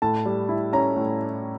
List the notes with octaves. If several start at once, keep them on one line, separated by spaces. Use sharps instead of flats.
A2 A5
G3
E4
C#4 A#5
A2